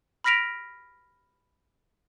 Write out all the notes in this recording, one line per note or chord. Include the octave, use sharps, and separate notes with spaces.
B5 F6 A#6 B6 D7 F7